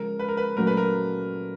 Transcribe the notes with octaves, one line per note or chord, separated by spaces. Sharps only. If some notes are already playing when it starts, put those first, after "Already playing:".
Already playing: C#3 F3 G#3 A#4
B4
A#4
B4
A#2 F#3 A3 C#4 A#4
B4
A#4